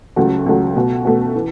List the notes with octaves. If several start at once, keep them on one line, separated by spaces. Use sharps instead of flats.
C#2 C#3 F#3 A3 F#4
C#2 C#3 F#3 A3 F#4
B2 A3 F#4
B2 A3 F#4
E3